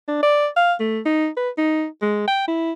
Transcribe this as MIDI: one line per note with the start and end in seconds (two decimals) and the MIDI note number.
0.08 0.19 62
0.23 0.48 74
0.56 0.74 77
0.80 1.00 57
1.06 1.28 63
1.37 1.50 71
1.58 1.86 63
2.02 2.24 56
2.28 2.44 79
2.48 2.72 64